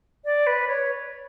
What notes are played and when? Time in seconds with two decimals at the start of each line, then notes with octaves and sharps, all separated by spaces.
0.25 D5
0.47 B4
0.68 C#5